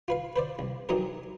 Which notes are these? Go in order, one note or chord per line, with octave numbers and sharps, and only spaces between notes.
F4 B4 F5
B4 C5 D5
C2
E3 F#3 D#4 G4 A#4